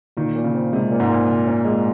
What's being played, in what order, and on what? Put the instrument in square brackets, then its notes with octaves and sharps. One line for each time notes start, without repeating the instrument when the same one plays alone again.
[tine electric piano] A#2 [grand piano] D#3
[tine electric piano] A#2
[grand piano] C#3
[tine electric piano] C4
[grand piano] C3 [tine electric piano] G#3
[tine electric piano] A#2
[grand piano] G#2
[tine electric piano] A#2
C2
C#4
G#3